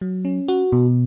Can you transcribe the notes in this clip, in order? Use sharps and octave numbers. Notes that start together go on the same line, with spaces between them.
F#3
C#4
F#4
B2